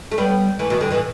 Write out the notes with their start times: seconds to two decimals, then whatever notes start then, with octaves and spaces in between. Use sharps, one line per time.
0.12 A3
0.18 G3 B3
0.59 E3 A3
0.70 B2 E3
0.81 D3 G3
0.91 B2 E3